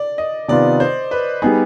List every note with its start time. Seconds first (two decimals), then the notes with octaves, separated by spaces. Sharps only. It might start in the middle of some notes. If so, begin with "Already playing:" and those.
Already playing: D5
0.18 D#5
0.48 C3 D#3 B3 F4 D5
0.80 C5
1.11 B4
1.42 G3 B3 D#4 G#4